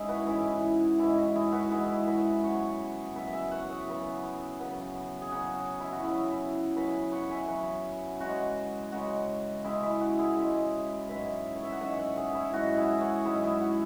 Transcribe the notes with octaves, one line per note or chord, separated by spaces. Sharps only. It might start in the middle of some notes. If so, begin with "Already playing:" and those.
Already playing: G#2 C#4 E4 G#4
F#4 B4
G#2 E3 C#4 E4 G#4
G#2 E3 C#4 E4
F#4
E4 G#4
F#4 B4
G#2 E3 C#4 E4 G#4
F#4 B4
C#3 F#3 B3 C#5 F#5
C#3 F#3 B3 B4 E5
E5 G#5
C#5 F#5
G#4 C#5
C#3 F#3 B3
C#3 F#3 B3
G#4
C#3 F#3 C#4 F#4
E4
F#4
C#3 F#3 C#4 E4 G#4
C#3 F#3 C#4 F#4 B4
C#5 F#5
E5 G#5
C#3 F#3 C#4 C#5 F#5
C#3 G#3 C#4 F#4
C#3 G#3 C#4 F#4
C#3 G#3 C#4 E4 G#4
E4
F#4
E4 G#4
C#3 G#3 C#4
G#2 F#3 C#4 B4 E5
C#5
E5
F#5
G#2 F#3 C#4 E5 G#5
E5
C#5 F#5
G#4 C#5
E4
G#2 F#3 C#4 F#4
E4 G#4
C#5 F#5
G#2 F#3 C#4 E4 G#4
E4 G#4
F#4